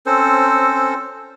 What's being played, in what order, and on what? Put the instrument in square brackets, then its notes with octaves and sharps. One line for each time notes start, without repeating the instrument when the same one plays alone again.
[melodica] C4 C#4 A4 C5